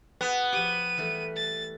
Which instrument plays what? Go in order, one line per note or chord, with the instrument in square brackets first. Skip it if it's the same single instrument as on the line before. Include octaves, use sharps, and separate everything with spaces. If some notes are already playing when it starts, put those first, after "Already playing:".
[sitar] B3 [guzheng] F#4 G#4 B4
[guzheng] F3 G4 [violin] D#7
[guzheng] E3 G3 A3
[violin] A6